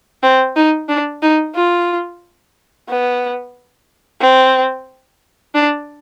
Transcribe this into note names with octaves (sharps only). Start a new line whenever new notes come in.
C4
D#4
D4
D#4
F4
B3
C4
D4